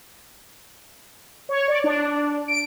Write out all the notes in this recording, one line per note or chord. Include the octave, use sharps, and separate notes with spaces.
C#5
D5
D4
D7